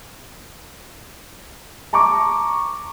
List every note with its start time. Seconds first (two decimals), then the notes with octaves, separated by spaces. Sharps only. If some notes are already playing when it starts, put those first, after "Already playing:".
1.93 A5 A#5 C#6 D6